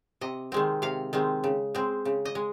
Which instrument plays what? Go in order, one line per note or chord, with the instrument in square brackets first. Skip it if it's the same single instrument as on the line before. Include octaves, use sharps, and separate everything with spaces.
[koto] C3 D#5
D#3 G#3 C4
C3 F5
D#3 G#3 C4
C#3
G#3 C4
C#3
D#5
G#3